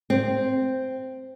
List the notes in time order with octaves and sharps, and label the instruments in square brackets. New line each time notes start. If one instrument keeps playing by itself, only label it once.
[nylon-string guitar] C4